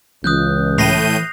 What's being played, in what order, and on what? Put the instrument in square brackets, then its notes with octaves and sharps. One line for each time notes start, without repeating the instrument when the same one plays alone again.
[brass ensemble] C#2 [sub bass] E3 [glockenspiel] D#6 F#6 G6
[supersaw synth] A2 G6 D#7 [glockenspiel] A#6 C7 F7